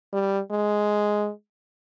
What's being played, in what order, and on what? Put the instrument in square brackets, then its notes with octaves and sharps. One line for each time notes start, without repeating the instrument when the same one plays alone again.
[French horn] G3
G#3